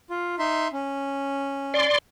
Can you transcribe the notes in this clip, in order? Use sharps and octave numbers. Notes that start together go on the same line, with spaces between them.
F4
D#4 E5 C6
C#4
D5 C6